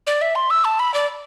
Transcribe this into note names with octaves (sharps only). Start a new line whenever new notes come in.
D5
E5
C6
E6
A5
B5
D5